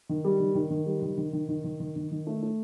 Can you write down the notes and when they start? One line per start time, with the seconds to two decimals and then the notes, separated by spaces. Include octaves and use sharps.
0.09 D#3
0.24 G3
0.40 D#3
0.55 D#3
0.71 D#3
0.86 G3
1.02 D#3
1.17 D#3
1.33 D#3
1.48 D#3
1.64 D#3
1.80 D#3
1.96 D#3
2.12 D#3
2.27 A3
2.43 A3